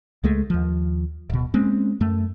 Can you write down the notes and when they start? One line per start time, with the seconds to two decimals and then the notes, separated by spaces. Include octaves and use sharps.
0.23 C#2 G#3 A3
0.50 D#2 F3
1.30 D1 B2
1.54 G#3 A#3 C4 C#4
2.00 F#2 A3